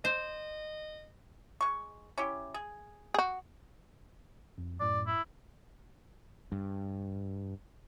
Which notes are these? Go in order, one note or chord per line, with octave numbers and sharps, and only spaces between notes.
C5 D#5
G#3 C#6
C#4 E4 G4
G#4
F#4 G#4
F2
F#2 A2 D5
E4
G2